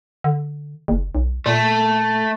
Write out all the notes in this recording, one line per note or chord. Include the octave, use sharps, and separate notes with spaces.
D3
F#1
B1
A#2 A3